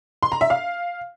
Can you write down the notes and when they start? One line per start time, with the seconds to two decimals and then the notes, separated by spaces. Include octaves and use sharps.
0.23 C6
0.32 A#5
0.41 E5
0.50 F5